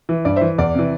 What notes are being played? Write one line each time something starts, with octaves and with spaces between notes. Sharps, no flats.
E3
G2 D5
E3 C5 E5
E2 D5
C3 E3